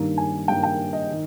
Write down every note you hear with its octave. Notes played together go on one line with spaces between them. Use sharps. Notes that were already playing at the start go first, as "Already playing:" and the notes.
Already playing: G2 D#3 A#3
G#5
G2 D#3 A#3 G5
G5
D#5
D#3